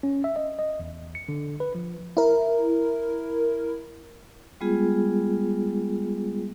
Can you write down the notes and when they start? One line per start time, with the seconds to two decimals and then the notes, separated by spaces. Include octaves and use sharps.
0.03 C#4
0.24 E5
0.36 D#5
0.59 D#5
0.79 E2
1.15 C#7
1.29 D3
1.60 B4
1.75 F3
2.17 E4 A#4
4.61 G3 G#3 B3 F4 G#4